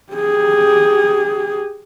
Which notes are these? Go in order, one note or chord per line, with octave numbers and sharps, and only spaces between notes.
G4 G#4